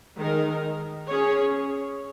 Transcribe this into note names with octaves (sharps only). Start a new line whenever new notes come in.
D#3 G#3 D#4 A#4
C#4 G#4 C#5